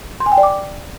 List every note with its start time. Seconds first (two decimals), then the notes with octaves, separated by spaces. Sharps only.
0.20 C6
0.26 G#5
0.32 G5
0.38 D5
0.43 D6